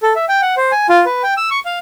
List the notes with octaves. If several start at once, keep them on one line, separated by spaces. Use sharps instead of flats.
A4
E5
G5
F#5
C5
G#5
F4
B4
G5
E6
C#6
F5